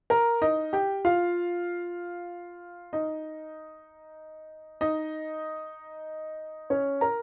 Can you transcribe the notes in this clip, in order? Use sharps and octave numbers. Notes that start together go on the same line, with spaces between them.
A#4 A#5
D#4 D#5
G4 G5
F4 F5
D#4 D#5
D#4 D#5
C#4 C#5
A#4 A#5